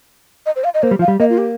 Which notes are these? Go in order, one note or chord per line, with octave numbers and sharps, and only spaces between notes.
D#5
C5
F5
D#5
A#3 C5
G3
F3 F5
G3
A#3 D#5
F4
G4